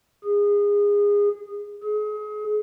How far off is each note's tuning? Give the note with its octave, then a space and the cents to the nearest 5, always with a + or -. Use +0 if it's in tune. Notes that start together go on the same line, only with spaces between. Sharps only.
G#4 -25
G#4 +30